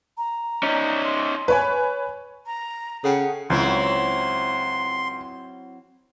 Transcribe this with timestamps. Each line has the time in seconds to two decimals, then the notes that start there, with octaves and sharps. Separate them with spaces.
0.18 A#5
0.63 C#4 D#4
1.05 C6
1.48 B4 C#5 G#5
2.46 A#5
3.04 C#3 A4 F#5 G5
3.50 C#2 F#3 C4 E4 C6